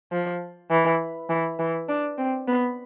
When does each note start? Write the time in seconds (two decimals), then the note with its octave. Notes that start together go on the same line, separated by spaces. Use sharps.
0.12 F3
0.71 E3
1.29 E3
1.59 E3
1.89 D4
2.18 C4
2.48 B3